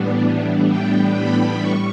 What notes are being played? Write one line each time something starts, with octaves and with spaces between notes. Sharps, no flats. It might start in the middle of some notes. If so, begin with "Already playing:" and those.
Already playing: A2 E3 G3 B3 D4
G5
B5
A2 G3 C#6